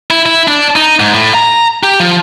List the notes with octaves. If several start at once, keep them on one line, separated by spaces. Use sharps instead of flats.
E4
E4
D4
D#4
G#2
A2
A#5
G4
F3